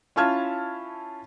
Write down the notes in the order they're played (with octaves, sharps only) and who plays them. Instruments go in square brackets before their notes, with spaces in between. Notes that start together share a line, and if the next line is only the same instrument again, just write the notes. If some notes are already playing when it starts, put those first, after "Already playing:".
[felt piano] C#4 E4 F4 A5 F6 G#6